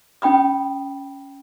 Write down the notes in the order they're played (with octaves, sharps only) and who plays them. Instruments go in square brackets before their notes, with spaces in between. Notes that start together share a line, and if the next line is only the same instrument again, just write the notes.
[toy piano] C#4 G5 B5 D#6